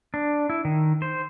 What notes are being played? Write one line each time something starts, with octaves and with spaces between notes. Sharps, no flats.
D4
E4
D#3
C5